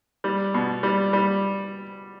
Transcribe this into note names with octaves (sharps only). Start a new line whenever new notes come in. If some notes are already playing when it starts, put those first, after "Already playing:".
G3
B2
G3
G3